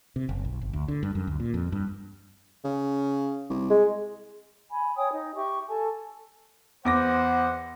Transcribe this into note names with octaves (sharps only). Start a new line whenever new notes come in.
C3
F#1
B1
G1
D2
D3
G2
F#2
D2
A#2
F2
G2
C#3
C2
G#3
G#5 B5
C#5 G5 G#5 D#6
D#4
G4 E5 C#6
A4 G#5 A5
E2 C5 F#5 D6 A#6